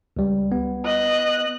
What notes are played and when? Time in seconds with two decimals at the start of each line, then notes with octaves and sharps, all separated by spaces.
0.17 C#2 G3
0.52 B3
0.86 D#5 F#6